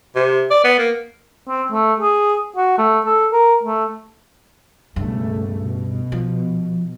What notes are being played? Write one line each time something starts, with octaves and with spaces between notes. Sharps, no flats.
C3
D5
B3
A#3
C4
A3
G#4
F#4
A3
A4
A#4
A3
C#2 G2 B2 A3
B2
F3